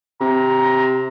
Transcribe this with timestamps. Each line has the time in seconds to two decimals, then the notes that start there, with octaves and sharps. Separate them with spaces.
0.21 C3 A#5